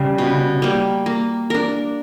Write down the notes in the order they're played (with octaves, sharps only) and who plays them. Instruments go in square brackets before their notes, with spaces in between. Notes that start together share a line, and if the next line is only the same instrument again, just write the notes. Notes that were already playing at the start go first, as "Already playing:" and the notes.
Already playing: [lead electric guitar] C#3 [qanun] G3
[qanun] B2
G3 A#3
A#3
D4 A#4